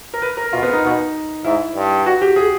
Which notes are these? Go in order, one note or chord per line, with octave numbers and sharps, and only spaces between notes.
A#4
B4
A#4
B2 F4
B3
D#4
B2
G#2 E4
G2
F#4
G4
G#4